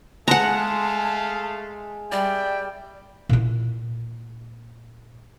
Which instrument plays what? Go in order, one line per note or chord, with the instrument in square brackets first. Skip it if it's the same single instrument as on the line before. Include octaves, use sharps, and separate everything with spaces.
[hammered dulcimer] G#3 [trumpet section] A3 G#4 F5 [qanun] F#5 A#5 [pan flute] A5
[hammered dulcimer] G3 [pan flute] D5 [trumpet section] E5 G5
[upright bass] A#2 E4